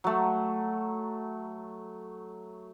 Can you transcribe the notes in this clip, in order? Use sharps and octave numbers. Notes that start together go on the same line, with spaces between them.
F#3 A3